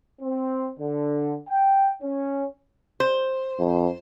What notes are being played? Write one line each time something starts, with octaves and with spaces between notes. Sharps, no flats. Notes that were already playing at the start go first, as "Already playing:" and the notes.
C4
D3
G5
C#4
C5
F2